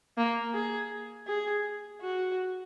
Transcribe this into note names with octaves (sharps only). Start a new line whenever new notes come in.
A#3
G#4
G#4
F#4